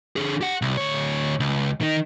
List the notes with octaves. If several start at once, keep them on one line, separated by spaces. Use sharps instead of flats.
D3 G#4
G4 F#5
C2
D2 C#5
C#2
D#3 D#4